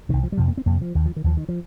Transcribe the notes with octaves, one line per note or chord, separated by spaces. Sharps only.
C2 C3 D#3
F3
G3
F2 C3 F3
A#3
C4
F2 C3 A#3
F3
D#2 D#3
F3
D#3
D#2 F3
D#3
F3